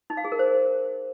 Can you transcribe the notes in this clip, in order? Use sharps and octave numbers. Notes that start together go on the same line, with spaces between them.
D#4
F5
G#4
A#4
C5